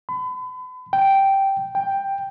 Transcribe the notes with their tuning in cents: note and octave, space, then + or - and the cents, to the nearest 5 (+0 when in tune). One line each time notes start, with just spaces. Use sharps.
B5 +40
G5 -5
G5 +10